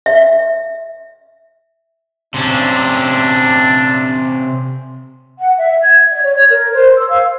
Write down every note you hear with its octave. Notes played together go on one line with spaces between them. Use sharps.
E5
C3 C#4 D4
F#5
E5
G#6
D5
C#5
G#6
A#4
C5
E6
F5